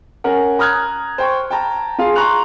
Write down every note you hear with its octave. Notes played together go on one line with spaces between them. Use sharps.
C#4 A#4 F#5
A#5 D#6 F6 F#6 G#6
C5 G5 C#6
G5 A5 A#5
F4 G#4 F5
A#5 C6 C#6 F#6 F7